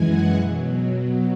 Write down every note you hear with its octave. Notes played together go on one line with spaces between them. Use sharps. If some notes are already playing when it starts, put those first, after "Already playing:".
Already playing: F#2 E3 G#3 F#5 G#5
B2 F#3